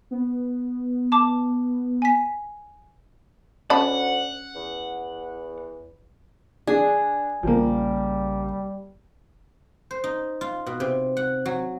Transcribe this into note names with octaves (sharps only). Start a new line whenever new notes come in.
B3
A5 D6
G#5 B6
D2 C#4 F#5 A5 B5
E2
D4 G#4
A#1 C#3 F3 G3 A#3
C5
D#4
F4
B2
C3
F#5
F#3